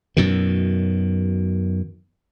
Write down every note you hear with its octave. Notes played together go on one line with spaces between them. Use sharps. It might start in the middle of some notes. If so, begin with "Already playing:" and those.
F#2 B2 D#3